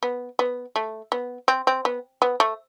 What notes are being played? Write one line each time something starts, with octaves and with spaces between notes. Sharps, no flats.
B3
B3
A3
B3
C4
C4
B3
B3
A3